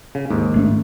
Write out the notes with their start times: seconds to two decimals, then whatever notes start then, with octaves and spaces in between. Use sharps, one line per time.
0.15 C#3
0.31 D#2 G#2
0.54 G#1 A3 C#4